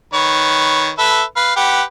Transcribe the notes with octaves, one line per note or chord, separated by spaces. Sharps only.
D#3 B4 C#5
A4 B4 E5
B4 F5
G4 B4 F#5